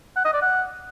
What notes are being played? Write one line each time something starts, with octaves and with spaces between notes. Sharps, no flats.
F#5
D#5
D5
F#5